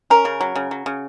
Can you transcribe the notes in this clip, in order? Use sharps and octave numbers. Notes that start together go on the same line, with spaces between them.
C#4 A#4
C#3
F#3
C#3
F#3
C#3